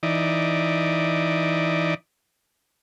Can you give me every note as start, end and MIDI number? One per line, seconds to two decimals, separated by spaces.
0.03 1.94 52
0.03 1.94 63
0.03 1.94 74